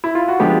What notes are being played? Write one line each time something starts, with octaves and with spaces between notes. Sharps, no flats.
E4
F4
F#4
D3 F3 G#3 B3 G4